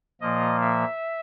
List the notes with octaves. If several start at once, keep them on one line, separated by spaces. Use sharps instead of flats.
A#2 F3 A#3 D#5
E5